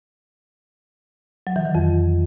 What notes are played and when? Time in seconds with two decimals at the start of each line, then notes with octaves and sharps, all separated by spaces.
1.47 F#3
1.56 E3
1.65 D#3
1.75 F2